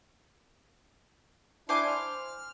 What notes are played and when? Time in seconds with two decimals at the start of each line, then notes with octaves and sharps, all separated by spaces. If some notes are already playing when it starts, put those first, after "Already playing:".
1.69 D4 E4 C5 G#5 D6
1.87 F6